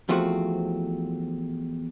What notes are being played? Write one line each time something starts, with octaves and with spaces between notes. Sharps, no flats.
E2 F3 A3 C4 F#4